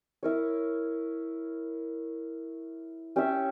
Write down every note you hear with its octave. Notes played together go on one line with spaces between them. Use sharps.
E4 A#4 C#5
C#4 G4 C#5 E5